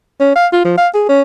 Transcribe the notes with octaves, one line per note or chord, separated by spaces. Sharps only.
C#4
F5
F4
F3
F5
G#4
C#4